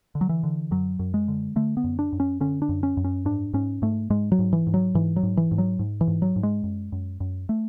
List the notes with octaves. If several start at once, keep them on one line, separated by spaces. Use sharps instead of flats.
D3
F#3
E3
D3
F#2 F#3
F#2
G#3
D3
D3 A3
B3
F#2
D4
F#2
C#4
D3 C#4
D4
F#2
C#4
F#2
C#4
G#2 D4
G#2 C#4
G#2 A3
G#2 G#3
F#3
G#2
E3
G#2
F#3
G#2 E3
F#3
G#2
E3
G#2
F#3
G#2
E3
G#2
F#3
G#2
G#3
F#2
F#2
F#2
A3